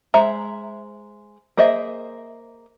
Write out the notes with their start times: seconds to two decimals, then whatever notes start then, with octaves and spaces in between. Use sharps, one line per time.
0.14 G#3 C5 E5 A#5
1.57 A#3 G#4 C5 D#5 E5